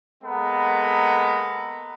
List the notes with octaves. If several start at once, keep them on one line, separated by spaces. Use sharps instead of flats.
G#3 A#3 B3 A4 A#5 B5